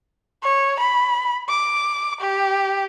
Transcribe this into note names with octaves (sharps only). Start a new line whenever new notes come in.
C#5
B5
D6
G4